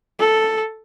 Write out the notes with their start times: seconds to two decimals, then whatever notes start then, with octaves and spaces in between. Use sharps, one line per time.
0.19 A4